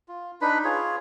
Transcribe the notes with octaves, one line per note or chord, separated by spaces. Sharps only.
F4
D4 D#4 B4 B5
F4 G#4 C#5